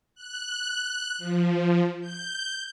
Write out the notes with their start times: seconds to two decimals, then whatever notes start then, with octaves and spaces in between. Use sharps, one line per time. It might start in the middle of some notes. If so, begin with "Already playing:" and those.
0.15 F#6
1.18 F3
2.00 G6